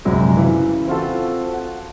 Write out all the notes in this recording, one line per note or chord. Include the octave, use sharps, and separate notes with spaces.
A#1 F#2 C3 F#3 G#3
C#3 E3
C4 F4 F#4 A4
F#5